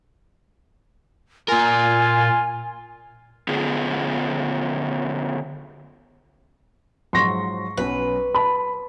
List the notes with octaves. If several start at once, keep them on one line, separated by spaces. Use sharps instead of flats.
A#2 F4 A#4 G#5
D3 B3 C#4 F4 G#4
G#2 F3 F#3 C6 C#6 A#6
B1 F#3 C#4 B4
A5 B5